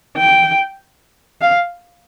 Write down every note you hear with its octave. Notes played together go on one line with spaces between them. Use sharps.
G5
F5